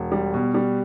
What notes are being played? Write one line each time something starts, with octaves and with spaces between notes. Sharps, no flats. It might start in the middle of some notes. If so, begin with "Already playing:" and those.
Already playing: E1
G3
B2
G3